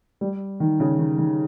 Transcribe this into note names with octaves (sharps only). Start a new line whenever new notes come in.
G3
D#3
C#3
D#3
D#3